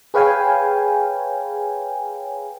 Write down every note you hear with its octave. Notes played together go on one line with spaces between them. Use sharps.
G#4 B4 C#5 F5 G5 G#5